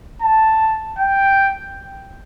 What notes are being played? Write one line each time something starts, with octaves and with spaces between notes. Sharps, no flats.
A5
G5